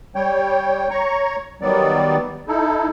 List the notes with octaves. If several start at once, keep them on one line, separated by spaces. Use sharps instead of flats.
G3 C#5 G5
C#5 A#5 C#6
D#3 F#3 G3 B3 D5
D#4 E4 A4